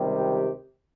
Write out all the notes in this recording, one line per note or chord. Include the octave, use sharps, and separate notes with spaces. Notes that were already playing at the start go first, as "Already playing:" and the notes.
Already playing: C#2 C3 D#3 G3
G4